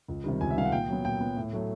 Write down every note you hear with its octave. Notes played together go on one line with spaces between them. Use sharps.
C#2
C3 D#3 G3
C#2 G#5
E5
C3 D#3 G3 F5
F#5
A#2 G5
F#3 B3
A#2 G5
F#3 B3
A2
F#3 A3